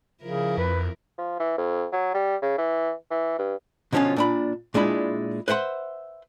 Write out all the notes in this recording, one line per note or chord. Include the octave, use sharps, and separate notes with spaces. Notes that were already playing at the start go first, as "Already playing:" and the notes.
C#3 F3 E4 A#4
F2 B4
F3
E3
F2
F#3
G3
C#3
E3
E3
G2
B2 D3 F3 B3 C#4 F4
A#2 D4 B5
A#2 G#3 D4 E4 B5
B4 C5 E5 F#5 C6